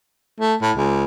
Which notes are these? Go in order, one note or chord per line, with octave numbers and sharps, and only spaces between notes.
A3
A2
C#2